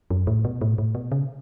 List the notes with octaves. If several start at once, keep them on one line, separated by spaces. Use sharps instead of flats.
F#2
A2
B2
A2
A2
B2
C#3